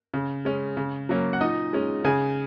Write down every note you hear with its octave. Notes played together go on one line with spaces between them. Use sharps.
C#3
G#3 C#4
C#3
F#3 A#3 C#4
F#5
A#2 D#4 D#5
G#3 C#4
C#3 G#4 G#5